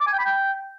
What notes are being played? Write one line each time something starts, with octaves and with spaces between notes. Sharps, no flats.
D6
G#5
G5
B5
G5